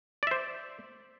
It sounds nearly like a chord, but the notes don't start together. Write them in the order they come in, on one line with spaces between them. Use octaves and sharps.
D5 E5 C5